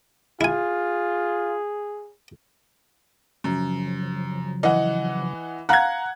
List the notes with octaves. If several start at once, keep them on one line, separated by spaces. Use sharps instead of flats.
E4 F4 G#4 G#5
F#2 C#3 F3 F#3
E3 D#5 F#5
F5 F#5 A#5 F#6 G#6